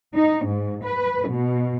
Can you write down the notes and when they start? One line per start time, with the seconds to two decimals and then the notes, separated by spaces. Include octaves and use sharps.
0.15 D#4
0.46 G#2
0.85 B4
1.31 B2